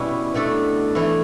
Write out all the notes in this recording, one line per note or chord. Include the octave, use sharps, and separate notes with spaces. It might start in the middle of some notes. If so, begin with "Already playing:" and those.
Already playing: B2 G3 C#4 E4 B4
B2 A3 D4 A4
E3 A3 E4